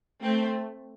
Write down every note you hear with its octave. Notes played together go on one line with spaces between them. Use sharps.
A3 C4